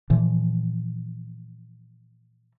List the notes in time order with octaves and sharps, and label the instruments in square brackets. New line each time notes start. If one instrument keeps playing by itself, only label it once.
[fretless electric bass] A#2 E3 F3